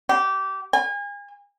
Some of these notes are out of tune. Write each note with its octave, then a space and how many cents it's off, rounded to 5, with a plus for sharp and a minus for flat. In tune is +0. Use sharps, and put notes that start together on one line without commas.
G4 -20
G#5 -35